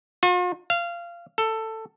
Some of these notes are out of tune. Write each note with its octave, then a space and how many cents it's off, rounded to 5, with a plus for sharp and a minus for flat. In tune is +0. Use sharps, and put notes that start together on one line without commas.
F4 +45
F5 -20
A4 +10